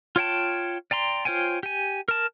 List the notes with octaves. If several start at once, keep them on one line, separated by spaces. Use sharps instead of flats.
F4 C#5 G5 A5
D5 G5 A#5 C6
F4 C5 C#5 G5 G#5
G4 G#5
A#4 A5